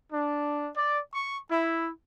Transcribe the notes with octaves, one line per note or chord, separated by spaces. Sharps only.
D4
D5
C#6
E4